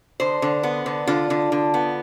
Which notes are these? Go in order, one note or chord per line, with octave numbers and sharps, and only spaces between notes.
D3 C5
D3
B3
D3
D3 F4
D3
D3
B3